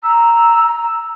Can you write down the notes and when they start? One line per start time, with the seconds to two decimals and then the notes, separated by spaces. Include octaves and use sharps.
0.04 A#5 E6